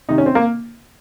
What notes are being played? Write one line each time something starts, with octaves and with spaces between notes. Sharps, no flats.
C3 D#3 D#4
C#4
C4
A#3